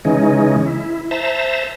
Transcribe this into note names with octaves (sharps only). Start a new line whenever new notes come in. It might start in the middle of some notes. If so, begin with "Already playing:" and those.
C#3 E3 G#3 C#4 D#4
E4
C5 E5 A5 A#5